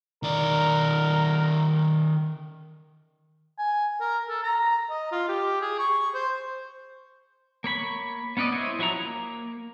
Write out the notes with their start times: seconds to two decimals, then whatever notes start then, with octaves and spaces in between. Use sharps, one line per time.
0.23 D#3 A#4 D5
3.58 G#5
4.00 A#4
4.29 A4
4.43 A#5
4.90 D#5
5.12 F4
5.29 G4
5.61 G#4
5.79 C#6
6.14 C5
7.64 A#3 C#5 B5 C#6
8.37 B3 C#4 B4 D5 D#5
8.52 E4 C5 C#5 D#5
8.79 F3 F#3 E4 C#5 A#5
8.95 A#3